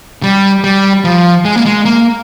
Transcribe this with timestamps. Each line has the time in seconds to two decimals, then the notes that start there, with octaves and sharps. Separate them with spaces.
0.23 G3
0.64 G3
1.04 F3
1.45 G#3
1.56 A#3
1.66 G#3
1.85 A#3